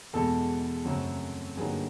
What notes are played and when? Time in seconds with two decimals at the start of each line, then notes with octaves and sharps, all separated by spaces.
0.13 E2 B2 G#3 A4
0.85 F#2 C#3 F#3 A3 C4
1.57 G2 D3 F#3 A#3 D#4 G#4